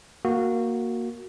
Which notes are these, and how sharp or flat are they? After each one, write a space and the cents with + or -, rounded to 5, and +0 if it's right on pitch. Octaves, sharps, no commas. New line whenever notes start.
A#3 +0 F#4 -5